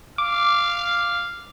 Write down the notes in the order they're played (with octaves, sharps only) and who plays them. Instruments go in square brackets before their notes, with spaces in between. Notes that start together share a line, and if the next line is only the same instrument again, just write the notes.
[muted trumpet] F5 [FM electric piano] D6